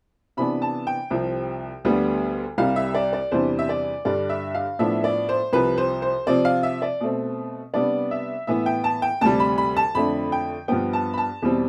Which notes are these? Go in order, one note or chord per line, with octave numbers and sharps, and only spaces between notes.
C3 E3 B3 D4 B5
A5
G5
C2 C3 F3 C4
D2 D3 G3 B3
C2 C3 G3 F5
E5
D5
D5
E2 C3 E3 G3 D4 C5
E5
D5
G2 D3 G3 D4 D5
E5
F5
A2 F3 B3 D4 E5
D5
C5
C2 C3 F3 B4
C5
C5
C3 F3 C4 D5
F5
E5
D5
B2 A3 C4
C3 G3 B3 D4 D5
E5
A2 E3 B3 E5
G5
A5
G5
D2 C3 G3 A5
B5
B5
A5
F2 D3 A3 D4 B5
G5
G2 F3 B3 G5
A5
B5
A5
E2 B2 G3 C4